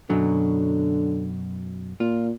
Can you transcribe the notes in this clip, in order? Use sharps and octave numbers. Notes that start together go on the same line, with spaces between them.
F#2 B2 D3 F#3
A#2 F4